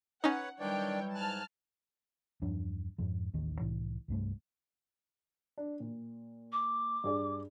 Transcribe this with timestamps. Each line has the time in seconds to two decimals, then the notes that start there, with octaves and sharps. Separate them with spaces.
0.24 C#4 D#4 B4 C#5 F#5
0.60 D#3 E3 F#3 G3 D4 C#5 D5 G5
1.15 G#2 G#5 A5 F6 F#6
2.42 E2 G2 F3 D4
2.98 F2 G#2 F3
3.34 A1 D#2 D#3
3.60 C2 A2 E3
4.08 C2 G2 A3
5.58 D4
5.80 A#2
6.52 D6
7.04 G2 G#4 D5